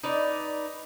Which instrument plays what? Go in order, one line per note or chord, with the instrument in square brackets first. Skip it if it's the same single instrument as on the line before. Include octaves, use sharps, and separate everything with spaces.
[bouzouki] D#4 B4 D5